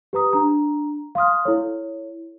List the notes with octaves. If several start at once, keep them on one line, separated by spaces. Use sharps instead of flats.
G4 B4 A#5 D#6
D4 A#5
F5 C6 D#6 F6
E4 A4 C#5